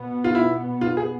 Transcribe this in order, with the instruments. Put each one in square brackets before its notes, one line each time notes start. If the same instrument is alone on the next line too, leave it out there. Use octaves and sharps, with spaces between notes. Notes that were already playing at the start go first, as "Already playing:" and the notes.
Already playing: [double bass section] B2 B3
[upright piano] F4
E4
F4
G#4